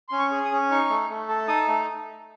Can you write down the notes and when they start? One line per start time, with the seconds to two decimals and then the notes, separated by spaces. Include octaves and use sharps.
0.09 C#4 C6
0.19 C#6
0.31 G#4
0.45 D#6
0.52 C#4
0.70 D#4 C#6
0.89 A3
1.10 A3
1.28 A4
1.48 D#4 D#6
1.68 A3